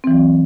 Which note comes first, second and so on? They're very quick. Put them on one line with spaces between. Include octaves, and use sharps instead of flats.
C4 E3 F#3